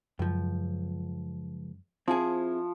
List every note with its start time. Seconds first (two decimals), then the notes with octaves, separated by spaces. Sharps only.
0.19 C#2 F#2 F3
2.08 F3 C4 E4 G#4